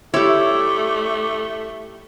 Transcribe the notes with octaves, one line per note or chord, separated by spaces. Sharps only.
G3 A3 E4 G4 C#5 D6